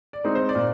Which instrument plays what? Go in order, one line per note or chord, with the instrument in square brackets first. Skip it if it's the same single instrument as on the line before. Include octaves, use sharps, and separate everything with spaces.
[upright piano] D5
G#3 C4 D#4
C5
D5
A#2